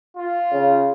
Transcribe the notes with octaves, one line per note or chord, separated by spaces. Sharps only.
F4
C#3